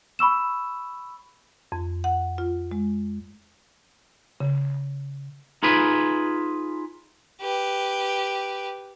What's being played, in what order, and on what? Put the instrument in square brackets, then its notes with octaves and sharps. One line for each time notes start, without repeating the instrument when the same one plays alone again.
[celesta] B5 C#6 E6 E7
[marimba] F2
F#5
F4
G#3
C#3
[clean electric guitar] D#4 F4 G#4 B4
[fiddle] G4 B4